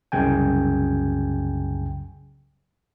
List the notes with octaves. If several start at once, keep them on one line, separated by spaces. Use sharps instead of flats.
C2 F#2 C#3 G5 G#5